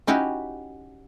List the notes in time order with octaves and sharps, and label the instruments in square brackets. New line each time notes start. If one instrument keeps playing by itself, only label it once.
[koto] C#4 D#4 E4 F#4 G4